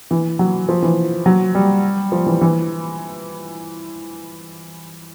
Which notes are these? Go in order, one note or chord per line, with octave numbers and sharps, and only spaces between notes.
E3
F#3
F3
E3
F#3
G3
F3
E3
E3